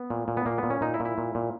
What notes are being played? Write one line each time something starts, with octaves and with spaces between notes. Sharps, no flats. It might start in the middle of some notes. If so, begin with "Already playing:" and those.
Already playing: B3
A#2
A#2
B3
A#2 A#3
B3
A#2
C#4
A#2 D#4
E4
A#2
E4
A#2
A#2